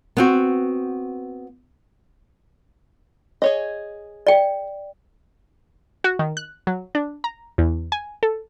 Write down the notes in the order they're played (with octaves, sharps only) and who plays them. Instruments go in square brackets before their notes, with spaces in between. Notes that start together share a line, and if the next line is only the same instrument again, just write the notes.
[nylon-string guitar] B3 C4 F#4
[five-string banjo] G#4 C#5 D#5
[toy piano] D5 G5
[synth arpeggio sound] F#4
D#3
F#6
F#3
D4
A#5
E2
G#5
A4